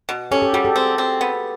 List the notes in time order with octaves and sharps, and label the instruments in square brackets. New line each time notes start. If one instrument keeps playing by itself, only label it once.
[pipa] B2
[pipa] C#4 [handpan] G4 A4
[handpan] G4 A4
[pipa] G3 [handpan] F#4 G#4
[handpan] G4 A4
[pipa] C4
C4
B3